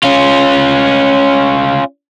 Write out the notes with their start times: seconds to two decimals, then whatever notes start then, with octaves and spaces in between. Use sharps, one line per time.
0.03 C#4 F4